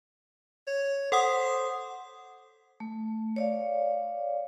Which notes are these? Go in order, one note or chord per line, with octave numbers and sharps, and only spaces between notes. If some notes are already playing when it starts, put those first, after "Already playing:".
C#5
A4 C5 F#5 D#6
A3
C#5 D5 F5